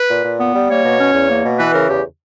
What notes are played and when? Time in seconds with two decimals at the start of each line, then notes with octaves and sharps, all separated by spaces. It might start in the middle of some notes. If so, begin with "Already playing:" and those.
Already playing: B4
0.09 A#2
0.24 A#2
0.39 B3
0.54 G3
0.69 A#3 C#5
0.84 B2
0.99 C#4
1.14 E2
1.29 A#3
1.44 B2
1.59 E3 B4
1.74 C#3 A#4
1.89 E2 G4